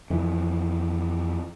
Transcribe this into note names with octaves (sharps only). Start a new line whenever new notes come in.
F2 E3